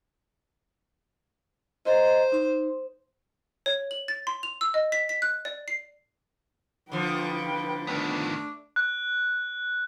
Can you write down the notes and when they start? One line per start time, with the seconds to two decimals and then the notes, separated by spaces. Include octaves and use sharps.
1.85 C5 D#5 A#5
2.32 D#4 C6
3.66 C#5
3.91 F#7
4.08 A6
4.27 C6
4.43 F7
4.61 E6
4.74 D#5
4.92 B6
5.09 B6
5.22 F#6
5.45 D5
5.68 C7
6.92 D3 F3 B4 G5
7.87 D#3 A3 B3 D4
8.76 F#6